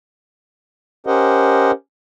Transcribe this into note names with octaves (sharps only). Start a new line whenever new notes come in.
C#4 G4 A#4 C5 D#5 F#5